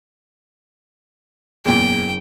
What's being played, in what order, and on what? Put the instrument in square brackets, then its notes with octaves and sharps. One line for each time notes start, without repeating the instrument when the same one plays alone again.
[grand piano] F#1 G#4 [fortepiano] E2 A#2 [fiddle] G5